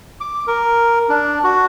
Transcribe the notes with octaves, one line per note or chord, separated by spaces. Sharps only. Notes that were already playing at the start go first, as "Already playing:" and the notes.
D6
A#4
D4
F#4